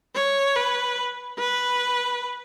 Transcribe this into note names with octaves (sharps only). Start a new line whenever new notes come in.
C#5
B4
B4